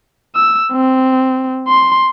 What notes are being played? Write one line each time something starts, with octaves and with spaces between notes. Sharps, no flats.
E6
C4
C6